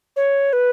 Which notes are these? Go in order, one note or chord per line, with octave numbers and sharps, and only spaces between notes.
C#5
B4